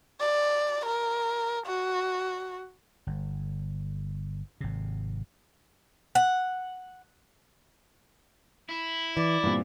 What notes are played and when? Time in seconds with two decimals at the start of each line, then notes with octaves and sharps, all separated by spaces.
0.20 D5
0.85 A#4
1.67 F#4
3.07 G1
4.61 G#1 C3
6.15 F#5
8.69 E4
9.17 E3 D5
9.43 G2 A#2 B3 C4